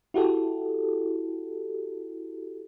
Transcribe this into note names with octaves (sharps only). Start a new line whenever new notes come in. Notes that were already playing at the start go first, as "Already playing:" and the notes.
E4 F#4 G4 A4